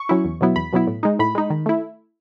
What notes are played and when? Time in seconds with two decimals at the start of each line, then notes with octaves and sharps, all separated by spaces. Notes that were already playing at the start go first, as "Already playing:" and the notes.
Already playing: C#6
0.09 F#3 C#4 E4
0.25 E2
0.41 B2 F#3 B3 E4
0.56 E2 B5
0.73 B2 F#3 B3 E4
0.87 A2
1.03 G#3 D#4
1.19 A2 B5
1.35 G#3 D#4
1.50 D#3
1.66 A3 E4